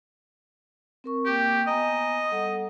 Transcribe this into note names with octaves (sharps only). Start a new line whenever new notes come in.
C4 A#4 C#6
A#3 G4 G5 D6
B3 D#5 G#5 A#5
G3 A4 F#5